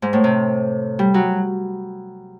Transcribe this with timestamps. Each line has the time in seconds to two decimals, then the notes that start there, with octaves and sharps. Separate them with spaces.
0.02 G#2
0.13 A2
0.24 C3
0.99 G3
1.14 F#3